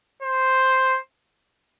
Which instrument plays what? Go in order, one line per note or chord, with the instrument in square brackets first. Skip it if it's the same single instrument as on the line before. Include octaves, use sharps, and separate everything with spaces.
[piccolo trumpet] C5